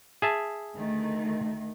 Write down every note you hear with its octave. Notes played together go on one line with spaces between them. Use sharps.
G#4 E5 A5
D2 D#3 A3